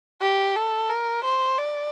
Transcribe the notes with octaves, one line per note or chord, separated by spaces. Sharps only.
G4
A4
A#4
C5
D5